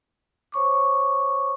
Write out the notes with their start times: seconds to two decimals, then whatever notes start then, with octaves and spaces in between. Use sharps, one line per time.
0.52 C5 C#5 C#6 D6